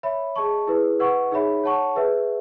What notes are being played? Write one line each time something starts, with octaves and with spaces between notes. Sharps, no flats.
C#5 E5 B5
G#4 D#5 A5 C#6
E4 G#4 B4
B4 D#5 F#5 C#6
D#4 G#4 C#5 E5 B5
C#5 F#5 A5 C#6
G#4 B4 E5